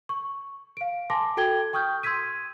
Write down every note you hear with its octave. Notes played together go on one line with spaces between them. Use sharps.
C#6
F5 D7
G#5 A5 C6 D6 A#6
F#4 A4 G5 G#6 G7
G5 C#6 D#6 F6 G6
C6 E6 G#6 B6 D#7